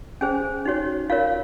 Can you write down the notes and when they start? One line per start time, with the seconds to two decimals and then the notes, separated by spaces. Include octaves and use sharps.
0.21 C#4 G#4 C5 G#5
0.65 D#4 F#4 C#5
1.10 F4 A#4 C#5 F5